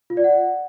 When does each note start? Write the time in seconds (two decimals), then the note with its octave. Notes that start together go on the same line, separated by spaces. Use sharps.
0.10 F4
0.17 D5
0.24 F#5